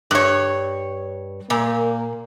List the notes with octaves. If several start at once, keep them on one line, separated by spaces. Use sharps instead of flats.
G2 C#5
A#2 A#3